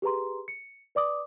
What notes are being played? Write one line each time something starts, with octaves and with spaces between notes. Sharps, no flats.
G4 G#4 B4 A#5 C6
C#7
B4 D5 D6 D#6